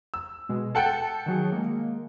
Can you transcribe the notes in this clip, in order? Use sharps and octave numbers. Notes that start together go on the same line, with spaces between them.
E6
B2 G#3
A4 F#5 G5 A5 C#7
D#3 F#3 G#4
G#3 A#3